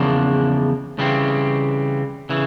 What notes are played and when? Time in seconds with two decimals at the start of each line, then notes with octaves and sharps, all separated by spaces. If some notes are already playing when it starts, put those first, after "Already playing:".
Already playing: E2 C#3 F3 A#3 D4
0.99 C#3 E3 G3 C4
2.29 C#3 E3